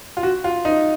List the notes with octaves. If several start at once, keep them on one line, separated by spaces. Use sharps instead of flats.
F4
F#4
F4
D#4